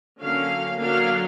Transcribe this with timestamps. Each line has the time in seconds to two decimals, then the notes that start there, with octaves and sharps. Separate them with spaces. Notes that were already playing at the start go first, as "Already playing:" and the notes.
0.20 D3 F#3 A#3 C#4 F5
0.80 D3 F#3 A#3 D4 F5